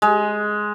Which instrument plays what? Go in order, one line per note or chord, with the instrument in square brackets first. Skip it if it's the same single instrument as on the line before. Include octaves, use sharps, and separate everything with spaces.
[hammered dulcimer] G#3